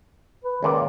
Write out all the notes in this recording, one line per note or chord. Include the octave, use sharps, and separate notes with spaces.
B4
C#2 A#2 D#3 D5